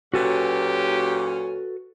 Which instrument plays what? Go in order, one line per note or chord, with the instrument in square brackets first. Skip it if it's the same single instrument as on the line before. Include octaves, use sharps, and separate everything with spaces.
[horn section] A#2 F#3 C#4 [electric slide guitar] F#4 A4 B4 [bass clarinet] G4